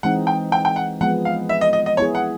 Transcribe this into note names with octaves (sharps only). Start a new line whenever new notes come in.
E3 G#3 C4 D#4 F#5
G5
G5
G5
F#5
F3 G#3 B3 F#5
F5
E5
D#5
D#5
D#5
B3 E4 G#4 C#5
F#5